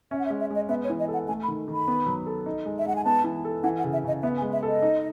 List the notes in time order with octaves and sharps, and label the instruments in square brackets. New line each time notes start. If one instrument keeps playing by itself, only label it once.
[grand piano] C#4 [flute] E5
[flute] F#5
E5
[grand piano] G#3
[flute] E5
[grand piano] G#3 [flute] D#5
[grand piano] B3 [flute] E5
[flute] C#5
[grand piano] E3
[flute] D#5
[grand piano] A4
[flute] F#5
[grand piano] A3 [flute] G#5
[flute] B5
[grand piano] D#3
D#3
[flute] B5
[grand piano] B3
F#3
A4
D#4
G#3
[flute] E5
[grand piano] G#3 [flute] F#5
[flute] G#5
[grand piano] B3 [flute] A5
[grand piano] E3
A4
[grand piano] E3 [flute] F#5
[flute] F#5
[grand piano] C#3
[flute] E5
[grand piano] C#3 [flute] D#5
[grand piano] B3 [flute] E5
[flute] G#5
[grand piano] G#3
[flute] E5
[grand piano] A4
[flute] D#5
[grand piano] D#4